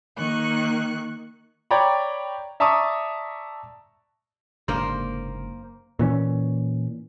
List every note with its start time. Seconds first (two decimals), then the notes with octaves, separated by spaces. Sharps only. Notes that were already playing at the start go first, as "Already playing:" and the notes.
0.17 D#3 A#3 C#6 F#6
1.71 C#5 D5 G5 A#5 B5
2.60 D5 E5 A5 A#5 C#6 D#6
4.68 F#1 G#2 C3 A#3 A#4 C5
5.99 A#2 E3 C#4